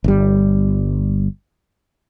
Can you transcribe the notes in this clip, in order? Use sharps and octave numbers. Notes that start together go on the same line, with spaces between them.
G1 G3